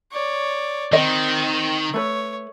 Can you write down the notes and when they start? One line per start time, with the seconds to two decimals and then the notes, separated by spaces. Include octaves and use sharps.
0.12 C#5 D5
0.93 D#3 C4 D#5
1.94 A3 B4 C#5